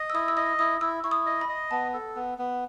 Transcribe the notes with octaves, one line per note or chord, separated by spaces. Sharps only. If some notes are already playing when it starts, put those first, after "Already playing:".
Already playing: D#5
E6
E4 D#6
E6
D#5 D#6
E4 D#6
E4 E6
E4 C#6
D#6
D#5
B5
D#5
B3 A5
A4
B3
B3